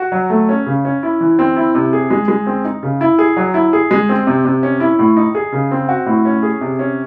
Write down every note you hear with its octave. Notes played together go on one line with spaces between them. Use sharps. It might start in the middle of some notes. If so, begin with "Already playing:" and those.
Already playing: F#4
F#3
A3
C#4
C#3
C#4
E4
E3
C4
E4
C3
G#4
G#3
G#3
C4
D#4
C#3
E4
G#4
F#3
E4
G#4
G#3
C4
C3
C3
C#4
E4
A2
D#4
G#4
C#3
C4
F#4
A2
C#4
G#4
C3
C#4